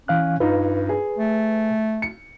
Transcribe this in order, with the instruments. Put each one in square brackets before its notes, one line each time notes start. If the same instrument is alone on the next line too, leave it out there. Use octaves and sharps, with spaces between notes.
[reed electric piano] E3 F5 F#6 [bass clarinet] C#4
[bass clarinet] G2 [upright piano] D#4 F4 [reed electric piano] B4
[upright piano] G#4
[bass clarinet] A3
[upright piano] C#7